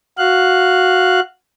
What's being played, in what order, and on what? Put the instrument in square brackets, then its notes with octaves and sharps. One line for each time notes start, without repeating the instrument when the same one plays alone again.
[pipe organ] F#4 F5 F#6